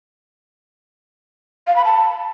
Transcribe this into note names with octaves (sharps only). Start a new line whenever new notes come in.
F5
B5
A5